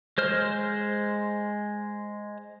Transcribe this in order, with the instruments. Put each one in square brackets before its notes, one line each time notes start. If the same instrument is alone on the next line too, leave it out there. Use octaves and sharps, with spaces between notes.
[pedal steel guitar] G#3 C5 F6